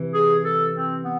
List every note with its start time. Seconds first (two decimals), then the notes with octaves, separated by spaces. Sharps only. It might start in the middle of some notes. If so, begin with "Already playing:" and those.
Already playing: C3 E3
0.14 G#4
0.44 A4
0.75 C4
1.04 B3